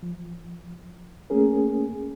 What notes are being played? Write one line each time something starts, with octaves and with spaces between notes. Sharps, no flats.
F3
A3 A#3 C#4 G#4 A#4